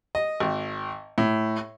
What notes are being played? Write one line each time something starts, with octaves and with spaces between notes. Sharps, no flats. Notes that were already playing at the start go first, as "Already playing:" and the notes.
D#5
G#1
A2